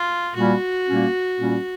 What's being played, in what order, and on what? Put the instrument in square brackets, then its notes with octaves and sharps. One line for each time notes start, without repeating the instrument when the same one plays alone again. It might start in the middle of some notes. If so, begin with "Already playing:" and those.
Already playing: [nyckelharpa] F4
[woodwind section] A#2 G3 A#3 C#4 [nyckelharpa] F#4
[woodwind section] A#2 G3 A#3 C#4
A#2 G3 A#3 C#4